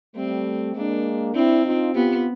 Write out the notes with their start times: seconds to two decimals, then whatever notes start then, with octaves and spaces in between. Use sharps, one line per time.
0.15 G3 A3 C4
0.75 G#3 A#3 D4
1.35 C4 D4 E4
1.65 D#4 F4
1.94 B3 F4 G4